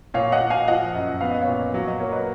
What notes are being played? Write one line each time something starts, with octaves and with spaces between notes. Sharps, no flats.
A#2 C#5 F5
D#5 F#5
A#2
F5 G#5
F3 D#5 F#5
F#2
B3 F5
D#5
C#5 F5
A#2
F#3 F5
D#5
A#3 C#5
B4 D#5